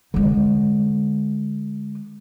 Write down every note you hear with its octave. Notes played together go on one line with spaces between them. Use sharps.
D3 G#3